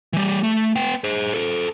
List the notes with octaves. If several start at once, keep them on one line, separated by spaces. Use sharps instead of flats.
E3 G3
A3
B3 G5
G#4 C5
A4 C5